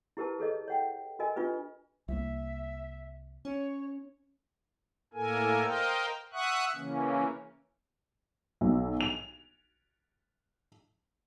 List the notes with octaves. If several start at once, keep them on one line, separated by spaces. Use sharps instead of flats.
E4 G4 A#4 B4 A5
G#4 A4 C#5 D#5
C#5 F#5 G5
F#4 A4 A#4 D#5 G#5
D4 F4 G4 B4
C2 A#3 E5
C#4 C#5
A2 A#3 A4 A#4 G#5
A#4 C5 D#5 F5 G5
E5 F#5 C#6 D#6 F#6
C#3 E3 A#3 C#4
B1
F7